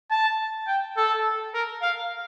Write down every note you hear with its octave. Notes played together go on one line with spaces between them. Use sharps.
A5
G5
A4
A#4
F5